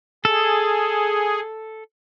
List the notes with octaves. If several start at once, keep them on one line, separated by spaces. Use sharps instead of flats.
G#4 A4